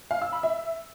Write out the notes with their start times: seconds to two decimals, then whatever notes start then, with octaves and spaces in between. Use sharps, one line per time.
0.11 F5
0.22 E6
0.32 B5
0.43 E5